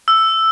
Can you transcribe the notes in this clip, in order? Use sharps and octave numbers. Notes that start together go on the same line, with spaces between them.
E6